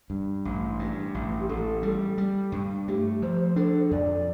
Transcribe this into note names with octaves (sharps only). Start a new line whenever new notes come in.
G2
A1
G2
A1
G4
A1 A4
G3
G3
G2
A3 G4
F3 C5
C5
D4 A4
F2 D5